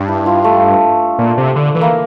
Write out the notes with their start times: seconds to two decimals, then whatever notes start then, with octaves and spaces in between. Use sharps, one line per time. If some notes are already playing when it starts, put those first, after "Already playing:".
Already playing: G2 D4
0.08 E4
0.26 F4
0.44 A3
1.19 A#2
1.37 C3
1.56 D3
1.75 E3
1.81 A#3